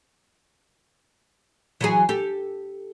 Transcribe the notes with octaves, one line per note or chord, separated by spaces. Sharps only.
E3 F#3 G#4
G4 A4